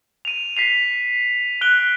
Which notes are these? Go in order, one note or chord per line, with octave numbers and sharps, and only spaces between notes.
D#7 F7
B6 C7 F7
F#6 D7 G7